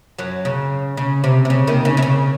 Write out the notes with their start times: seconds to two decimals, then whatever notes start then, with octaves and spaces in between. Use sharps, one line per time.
0.19 F#2 F#3
0.45 C#3
0.97 C#3
1.24 C3
1.45 C3
1.50 C#3
1.67 D#2 D#3
1.85 C#3
1.97 C3
2.02 C#3